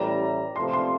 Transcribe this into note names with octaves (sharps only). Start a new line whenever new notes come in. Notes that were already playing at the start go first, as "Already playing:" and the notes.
Already playing: A1 A2 E3 G3 A#5
C3 F3 A3 C6
C6